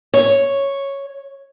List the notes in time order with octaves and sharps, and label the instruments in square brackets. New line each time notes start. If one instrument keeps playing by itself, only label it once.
[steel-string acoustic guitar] C#5